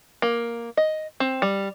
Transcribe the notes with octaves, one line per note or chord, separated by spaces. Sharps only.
A#3
D#5
C4
G3